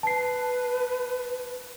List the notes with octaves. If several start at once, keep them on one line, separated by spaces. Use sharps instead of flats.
B4 A5 C7